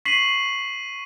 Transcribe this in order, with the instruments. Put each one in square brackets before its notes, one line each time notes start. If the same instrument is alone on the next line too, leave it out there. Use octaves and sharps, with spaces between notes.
[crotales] C#6 D#7 [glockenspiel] B6 C7 F#7